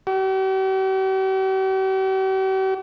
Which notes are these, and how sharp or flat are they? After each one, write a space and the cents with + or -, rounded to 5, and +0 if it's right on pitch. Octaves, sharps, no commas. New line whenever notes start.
G4 -45